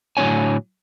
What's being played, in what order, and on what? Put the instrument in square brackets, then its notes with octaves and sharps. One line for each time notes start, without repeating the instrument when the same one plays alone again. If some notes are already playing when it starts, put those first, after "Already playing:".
[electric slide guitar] A2 D3 F#3 C#4 C#5 G#5